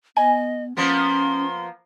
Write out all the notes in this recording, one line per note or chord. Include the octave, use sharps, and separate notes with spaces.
B3 D#5 G#5
F3 A#3 B3 C#4 C6